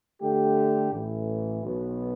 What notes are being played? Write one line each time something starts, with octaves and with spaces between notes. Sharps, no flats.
D3 A3 G4
A1 A2 E3
B1 B2 B3